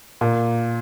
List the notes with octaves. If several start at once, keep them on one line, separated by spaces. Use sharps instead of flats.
A#2